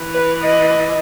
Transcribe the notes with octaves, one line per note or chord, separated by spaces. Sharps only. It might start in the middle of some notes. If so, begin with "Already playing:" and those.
Already playing: E3
B4
D#5